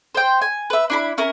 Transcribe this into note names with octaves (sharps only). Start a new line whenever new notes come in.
C5 G5
G#5
B4 E5
D4 E4 B5
C#4 E4 A#4